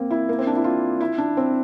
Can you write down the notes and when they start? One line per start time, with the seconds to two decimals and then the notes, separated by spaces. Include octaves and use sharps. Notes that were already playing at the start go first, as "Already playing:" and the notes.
Already playing: A#3 C4
0.10 E4
0.29 A#3
0.39 C4
0.47 D4
0.56 E4
0.64 F4
1.00 E4
1.18 D4
1.37 C4